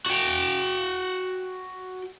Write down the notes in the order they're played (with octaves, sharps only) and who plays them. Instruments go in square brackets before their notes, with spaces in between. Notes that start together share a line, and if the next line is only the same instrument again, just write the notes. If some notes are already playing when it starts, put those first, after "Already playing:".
[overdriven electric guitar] F#4 G5